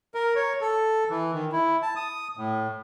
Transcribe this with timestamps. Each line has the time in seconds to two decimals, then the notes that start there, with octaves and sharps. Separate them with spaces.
0.14 A#4
0.35 C#5
0.61 A4
1.10 E3
1.33 D#3
1.52 E4
1.83 A5
1.96 D#6
2.37 A2